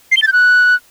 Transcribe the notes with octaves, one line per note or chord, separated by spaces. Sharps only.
C7
G7
A6
G6
F#6